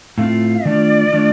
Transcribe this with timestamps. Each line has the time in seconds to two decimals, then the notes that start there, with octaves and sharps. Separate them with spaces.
0.18 A2 A3 C4 F4 F5
0.65 D#3 A3 D4 F4 D5
1.13 D#3 A3 D4 F4